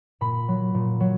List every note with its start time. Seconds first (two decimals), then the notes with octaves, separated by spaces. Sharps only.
0.21 A#2 B5
0.48 F#3
0.74 A#2
1.00 F#3